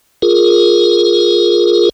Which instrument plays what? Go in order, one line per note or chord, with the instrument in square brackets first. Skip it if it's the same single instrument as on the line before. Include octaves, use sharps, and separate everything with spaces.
[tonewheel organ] F4 G#4 A#4